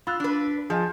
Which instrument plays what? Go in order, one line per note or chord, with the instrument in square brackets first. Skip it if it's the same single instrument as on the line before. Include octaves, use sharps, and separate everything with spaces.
[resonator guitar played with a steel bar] F4 [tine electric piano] B5 E6 F#6
[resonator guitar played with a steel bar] D4 B4
[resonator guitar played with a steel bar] F3 [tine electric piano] G#4 D#5 G#5